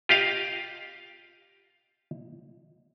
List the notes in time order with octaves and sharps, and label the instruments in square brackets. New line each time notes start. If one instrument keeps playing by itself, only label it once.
[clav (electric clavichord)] F4 G4 D#5 F5